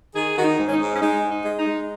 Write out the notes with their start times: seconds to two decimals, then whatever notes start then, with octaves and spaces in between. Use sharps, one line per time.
0.14 D#3 G#4
0.36 D#3 F#4
0.44 D#4
0.58 G#2
0.68 C#4
0.72 D#4
0.80 G#2
0.95 C#4
1.01 G#3 D#4
1.23 G#2
1.30 D#4
1.44 G#3
1.59 D#4
1.66 G#3